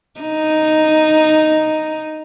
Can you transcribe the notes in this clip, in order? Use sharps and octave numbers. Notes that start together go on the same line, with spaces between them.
D#4